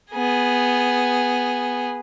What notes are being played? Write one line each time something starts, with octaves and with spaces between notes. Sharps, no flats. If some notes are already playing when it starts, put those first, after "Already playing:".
B3 G#4